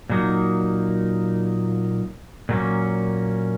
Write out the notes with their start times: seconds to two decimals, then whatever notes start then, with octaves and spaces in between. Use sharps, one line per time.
0.10 A#2 F#3 A#3 D#4
2.49 A#2 F#3 A#3 C#4